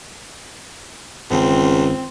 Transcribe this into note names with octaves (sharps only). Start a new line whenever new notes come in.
G1 C#2 D#3 C4 C#4